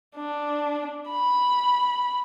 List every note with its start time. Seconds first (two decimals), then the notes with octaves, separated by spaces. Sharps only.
0.16 D4
1.11 B5